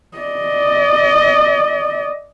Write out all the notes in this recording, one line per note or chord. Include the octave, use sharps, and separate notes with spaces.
D5 D#5